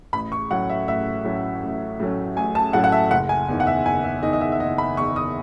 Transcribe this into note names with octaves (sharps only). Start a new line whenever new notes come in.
A1 B5
C#6
A2 F#3 A3 C#4 F#5
E5
A1 E5
A2 F#3 A3 C#4
A1
A2 F#3 A3 C#4
A1 G#5
A5
A2 F#3 A3 C#4 F#5
F#5
E5
F#1 F#5
G#5
E2 D#3
F#5
E5
F#1 G#5
E5
E2 D#3 D#5
D#5
E5
E5
F#1 D#5
B5
E2 D#3 C#6
D#6